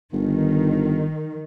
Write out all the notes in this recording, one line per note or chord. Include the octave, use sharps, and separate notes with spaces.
G1 D#3